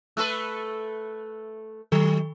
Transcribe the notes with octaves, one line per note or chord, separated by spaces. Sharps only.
A3 A4 B4 E6 F#6
D#3 F#3 A4